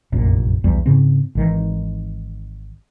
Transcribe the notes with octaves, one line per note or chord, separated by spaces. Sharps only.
F1 A#1 F#2 A#2
F1 B1 E2 G3
G#2 C#3 C4
G#1 D#3 E3